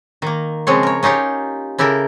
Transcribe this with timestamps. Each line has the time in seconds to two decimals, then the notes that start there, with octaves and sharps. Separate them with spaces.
0.22 D#3 A#3
0.67 C#3 F3 G#3 C4 C#5
0.83 A#4 C#5
1.03 C#4 D#4 F4 G4 C#5
1.78 C#3 E4 G4 A4 A#4